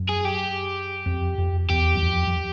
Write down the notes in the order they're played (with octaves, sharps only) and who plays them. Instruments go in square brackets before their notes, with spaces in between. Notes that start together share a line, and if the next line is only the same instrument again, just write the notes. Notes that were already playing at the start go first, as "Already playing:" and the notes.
Already playing: [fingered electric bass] F#2
[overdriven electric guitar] G#4
G4
[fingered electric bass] F2
F2
[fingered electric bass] E2 [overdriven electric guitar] G4
[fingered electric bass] F#2
F2
F2